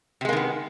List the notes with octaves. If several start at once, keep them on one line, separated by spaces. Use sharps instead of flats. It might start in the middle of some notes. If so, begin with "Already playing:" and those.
C3 D#3 G#3 A#3 B3